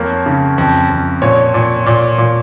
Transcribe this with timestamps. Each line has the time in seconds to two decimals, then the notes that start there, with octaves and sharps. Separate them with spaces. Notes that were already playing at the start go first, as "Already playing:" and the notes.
Already playing: F2 A#3 C#5
0.26 C#3
0.58 F2
0.90 F2
1.22 A#2 C#5
1.54 A#2
1.86 A#2
2.18 A#2